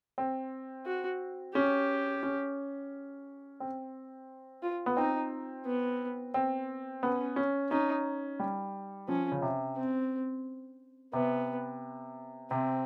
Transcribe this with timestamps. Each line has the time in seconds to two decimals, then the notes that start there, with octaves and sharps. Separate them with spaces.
0.18 C4
0.86 F#4
1.54 C#4 G4
2.23 C#4
3.60 C4
4.63 F4
4.86 B3
4.97 C4 D#4
5.66 B3
6.34 C4
7.03 B3 C#4
7.36 C#4
7.71 C#4 D#4
8.40 G3
9.08 F3 C#4
9.32 C#3
9.42 C3
9.77 C4
11.13 C3 B3
12.51 C3 C4